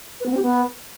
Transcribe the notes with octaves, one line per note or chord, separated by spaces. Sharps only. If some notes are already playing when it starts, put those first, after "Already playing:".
B4
B3
C4
G4
B3